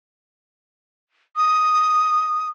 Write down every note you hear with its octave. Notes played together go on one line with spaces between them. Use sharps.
D#6